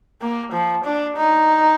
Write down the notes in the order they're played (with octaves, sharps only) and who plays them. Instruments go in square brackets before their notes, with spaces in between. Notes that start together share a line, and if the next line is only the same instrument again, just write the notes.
[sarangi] A#3
F3
D4
D#4